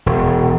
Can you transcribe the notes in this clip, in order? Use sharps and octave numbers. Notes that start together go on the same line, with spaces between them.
E1